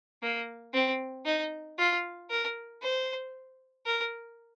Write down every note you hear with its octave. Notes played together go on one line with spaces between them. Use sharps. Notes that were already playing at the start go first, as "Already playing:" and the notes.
A#3
C4
D#4
F4
A#4
C5
A#4